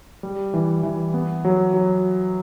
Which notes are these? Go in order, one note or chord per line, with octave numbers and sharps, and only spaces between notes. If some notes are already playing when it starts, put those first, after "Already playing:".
G3
E3
E3
B3
F#3
F#3